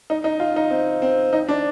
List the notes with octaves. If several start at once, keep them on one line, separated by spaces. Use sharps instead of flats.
D#4
D#4
F4
D#4
C4
C4
D#4
D4